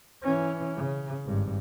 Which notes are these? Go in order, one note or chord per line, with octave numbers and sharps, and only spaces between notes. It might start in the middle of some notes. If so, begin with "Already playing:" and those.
E3 C#4
C#3
G#1 G2